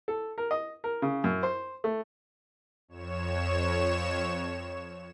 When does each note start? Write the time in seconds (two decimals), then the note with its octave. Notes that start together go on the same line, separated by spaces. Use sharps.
0.08 A4
0.38 A#4
0.51 D#5
0.84 A#4
1.02 C#3
1.24 F#2
1.43 C5
1.84 A3
2.88 F2 C#5 E7